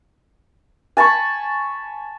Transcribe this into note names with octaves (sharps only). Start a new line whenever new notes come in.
G#5 A5 B5 C#6